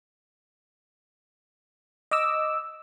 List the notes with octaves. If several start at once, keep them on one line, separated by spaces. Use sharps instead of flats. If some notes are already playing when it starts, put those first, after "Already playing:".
D#5 D6 E6